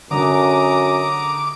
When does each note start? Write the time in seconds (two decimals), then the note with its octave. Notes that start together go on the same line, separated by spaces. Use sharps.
0.11 F#2 D3 A#5 D6 D#6